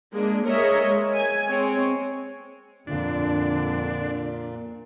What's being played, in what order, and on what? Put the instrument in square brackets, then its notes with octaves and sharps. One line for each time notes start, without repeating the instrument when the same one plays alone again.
[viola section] G#3 A#3 D4
G#4 A#4 C#5 D#5 E5
G#3
G#5
G#3 C4 C#5
[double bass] F2 [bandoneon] A#2 [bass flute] D3 [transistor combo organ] D4